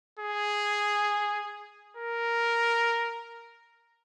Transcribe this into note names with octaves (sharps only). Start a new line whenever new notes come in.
G#4
A#4